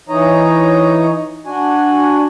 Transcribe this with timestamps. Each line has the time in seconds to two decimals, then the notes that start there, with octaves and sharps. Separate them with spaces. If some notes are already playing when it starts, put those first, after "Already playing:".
0.09 E3 D#4 C#5 D#5 A#5
1.46 D4 F#4 G#5